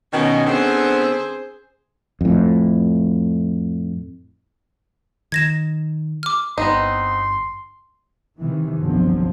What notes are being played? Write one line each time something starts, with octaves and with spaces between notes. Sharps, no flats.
B2 D#3 C#4
D3 B3 C4 G#4 C5
F2 A2
D#3 G#6 A#6 E7
D6 F6
G1 B3 C4 D#4 C6
C3 D#3 E3
G1 C2 D3 F3 F#3 C4